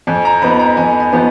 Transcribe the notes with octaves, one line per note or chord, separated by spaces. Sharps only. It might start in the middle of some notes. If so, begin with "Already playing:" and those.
F2 G#5
A#5
F3 B3 D#4 B5
A#5
F2 G#5
G#5
F3 B3 D#4